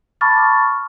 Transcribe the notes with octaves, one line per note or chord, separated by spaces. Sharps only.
A5 B5 C#6 D6 F6 A6